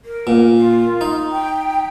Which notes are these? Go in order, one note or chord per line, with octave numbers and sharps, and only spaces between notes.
A#4
A#2
F4
D#4
G5